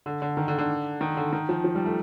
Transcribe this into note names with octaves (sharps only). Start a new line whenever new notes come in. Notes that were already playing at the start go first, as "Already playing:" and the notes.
D3
D3
D#3
D3
D3
D#3
D3
D#3
F3
F3
G3
A3